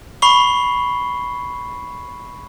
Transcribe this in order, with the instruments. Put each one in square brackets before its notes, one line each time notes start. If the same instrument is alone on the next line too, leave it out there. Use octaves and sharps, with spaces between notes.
[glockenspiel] B5 C#6 C7 G7